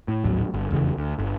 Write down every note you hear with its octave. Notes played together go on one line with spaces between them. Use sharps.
A2
A#1 D#2 A2 F#3
G1
F1 E2 C#3 E3
D2
G1